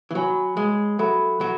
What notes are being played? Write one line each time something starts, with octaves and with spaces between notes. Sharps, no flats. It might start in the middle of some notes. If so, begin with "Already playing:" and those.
E3
F#3 C#5 G#5 B5
G#3
F#3 A4 E5 B5
F#3